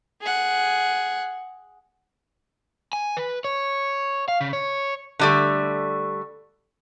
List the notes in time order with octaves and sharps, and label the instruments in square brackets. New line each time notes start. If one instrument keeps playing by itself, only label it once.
[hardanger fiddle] G#4 F#5
[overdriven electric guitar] G#5
B4
C#5
F5
C#3
C#5
[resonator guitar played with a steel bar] D3 G3 A3